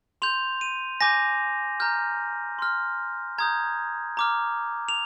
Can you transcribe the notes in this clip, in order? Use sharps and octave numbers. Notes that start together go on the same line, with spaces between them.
C6 G6 F7
D#7
G#5 D6 G6 A#6
A#5 F6 G6
C6 F6
A#5 D#6 G6 G#6
A#5 D6 F6
F7